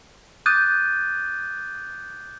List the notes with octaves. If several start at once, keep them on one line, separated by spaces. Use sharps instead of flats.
D6 D#6 F#6 G6 A6 D#7